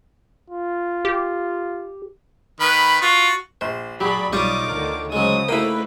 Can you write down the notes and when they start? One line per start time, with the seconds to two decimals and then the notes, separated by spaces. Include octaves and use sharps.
0.50 F4
1.05 G4
2.60 D#3 B4 B5
3.02 F4 F#4
3.61 A#1 C5
4.01 F#3 G4 G#4 D5 B5
4.33 B1 G3 D#4 F4 C#5 D5 D6 D#6
4.68 D2 D3 D#3 F6
5.12 C#3 F#3 G#3 C5 D#6
5.49 A3 A#3 D#4 E4 B4 G5 B5